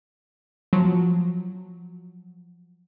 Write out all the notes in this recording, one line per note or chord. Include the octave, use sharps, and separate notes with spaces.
F3 F#3